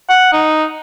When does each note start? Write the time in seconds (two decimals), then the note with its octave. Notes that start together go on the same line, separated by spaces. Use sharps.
0.09 F#5
0.33 D#4